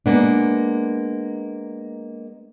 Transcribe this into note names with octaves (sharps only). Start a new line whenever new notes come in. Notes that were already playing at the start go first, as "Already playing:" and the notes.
G#3 A#3 B3 D4